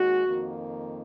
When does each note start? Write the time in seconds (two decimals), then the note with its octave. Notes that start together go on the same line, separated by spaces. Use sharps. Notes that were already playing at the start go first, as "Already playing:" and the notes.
Already playing: D#2 G#3 F#4
0.25 F2 D#3 A#3